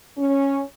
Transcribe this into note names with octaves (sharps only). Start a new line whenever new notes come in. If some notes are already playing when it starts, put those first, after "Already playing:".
C#4